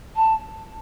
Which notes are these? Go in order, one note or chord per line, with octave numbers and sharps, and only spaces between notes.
A5